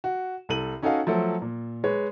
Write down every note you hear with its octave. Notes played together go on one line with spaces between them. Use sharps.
F#4
C2 A4 D#7 F#7
C#4 D#4 F#4 A4 D#5 F5
F3 F#3 A3 A4
A#2
G#3 B4 C#5